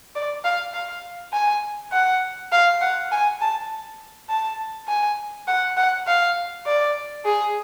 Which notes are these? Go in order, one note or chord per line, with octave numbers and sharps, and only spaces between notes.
D5
F5
F5
G#5
F#5
F5
F#5
G#5
A5
A5
G#5
F#5
F#5
F5
D5
G#4